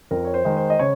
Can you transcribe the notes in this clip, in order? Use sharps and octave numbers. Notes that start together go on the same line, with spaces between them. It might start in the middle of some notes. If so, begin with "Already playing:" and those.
F2 A#4
C#5
C5
D#3 G#3
C5
D#5
C#3 C#5